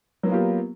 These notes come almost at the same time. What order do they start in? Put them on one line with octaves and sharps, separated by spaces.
F#3 B3 A#3 F4 G4